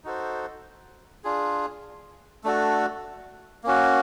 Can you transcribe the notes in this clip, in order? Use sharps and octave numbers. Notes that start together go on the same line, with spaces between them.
D#4 F#4 A4 C5
D4 F4 G#4
A3 D4 F#4 A4
A#3 C#4 F#4